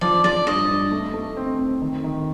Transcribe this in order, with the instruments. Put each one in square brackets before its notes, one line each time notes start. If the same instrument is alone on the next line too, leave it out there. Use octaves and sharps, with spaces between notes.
[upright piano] F3 [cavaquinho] D5
[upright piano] F3 [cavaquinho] D5
[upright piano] G2 [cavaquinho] D#5
[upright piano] G2
A3
A3
C4
C4
D#3
D#3